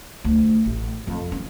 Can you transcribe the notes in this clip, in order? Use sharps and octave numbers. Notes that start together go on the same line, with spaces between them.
D2
A1
F2
C#4